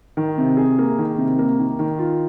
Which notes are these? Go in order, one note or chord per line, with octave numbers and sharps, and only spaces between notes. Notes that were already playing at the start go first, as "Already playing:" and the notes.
D#3
C3
G#4
A#3
D#3
C3
A#3
D#3
D#3
F4